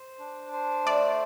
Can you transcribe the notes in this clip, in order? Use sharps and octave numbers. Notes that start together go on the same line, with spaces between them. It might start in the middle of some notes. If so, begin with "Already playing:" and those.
Already playing: C5
D4
C5
A3 D5